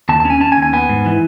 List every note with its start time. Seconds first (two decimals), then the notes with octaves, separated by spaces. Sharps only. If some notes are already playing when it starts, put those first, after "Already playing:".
0.09 D#2 A5
0.20 A5
0.25 C#4
0.30 G#5
0.40 C#4 A5
0.52 G#5
0.57 D#2
0.62 G#5
0.73 B3 G#5
0.89 G#2
1.06 E3